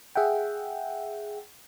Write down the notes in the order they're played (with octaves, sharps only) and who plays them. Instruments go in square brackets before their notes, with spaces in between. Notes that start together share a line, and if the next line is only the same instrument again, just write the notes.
[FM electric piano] G#4 E5 F#5 G5